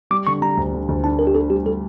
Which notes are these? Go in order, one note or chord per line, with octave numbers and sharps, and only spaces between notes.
G3 D6
D3 C#6
G3 A#5
D2
D3
D2
D4 A5
D4 A#4
G4
D4 A4
G3 G4
G3 A4